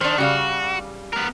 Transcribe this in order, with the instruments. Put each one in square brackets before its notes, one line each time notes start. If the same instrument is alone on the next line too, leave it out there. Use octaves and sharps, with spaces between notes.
[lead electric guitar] D#3 [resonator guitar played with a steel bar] D4 C5
[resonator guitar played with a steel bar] C#3 G3 F5 [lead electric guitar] F#4
[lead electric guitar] B3 A#4